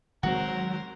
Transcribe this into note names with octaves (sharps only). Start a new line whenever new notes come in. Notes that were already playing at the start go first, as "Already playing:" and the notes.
D#3 F#3 G#3 C4 F#4 A#4 C5